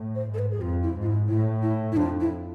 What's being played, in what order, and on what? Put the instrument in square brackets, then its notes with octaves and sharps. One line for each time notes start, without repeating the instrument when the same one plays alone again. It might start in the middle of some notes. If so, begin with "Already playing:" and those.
Already playing: [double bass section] A2
[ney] C5
[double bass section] G#2
[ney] A4
B4
G#4
[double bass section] F2 [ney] F4
[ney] E4
[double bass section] G#2
[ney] F4
E4
[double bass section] A2 [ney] E4
[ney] E4
E4
[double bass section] F2 [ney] D4
[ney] E4